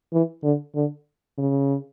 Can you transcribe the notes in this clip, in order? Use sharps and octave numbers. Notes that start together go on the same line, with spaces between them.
E3
D3
D3
C#3